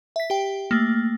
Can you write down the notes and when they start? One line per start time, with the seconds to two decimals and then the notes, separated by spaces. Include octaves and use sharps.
0.16 E5 B6
0.30 G4 G5
0.71 A3 A#3